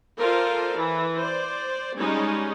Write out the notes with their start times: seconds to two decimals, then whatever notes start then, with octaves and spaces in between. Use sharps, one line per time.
0.17 F4 A4 A#4 C5 D5 F5
0.76 E3
1.18 C5 D5
1.97 G3 G#3 C#4 D#4